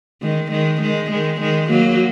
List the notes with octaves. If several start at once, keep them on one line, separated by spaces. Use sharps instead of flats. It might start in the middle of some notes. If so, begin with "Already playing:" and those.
D#3 G#3
D#3 G#3
D#3 G#3
D#3 G#3
D#3 G#3
F#3 A#3